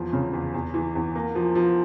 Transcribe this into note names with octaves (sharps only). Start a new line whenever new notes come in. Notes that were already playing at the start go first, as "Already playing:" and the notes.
Already playing: E2 F3
C#3
E2
E2
E3
E2
A#3
F3
F3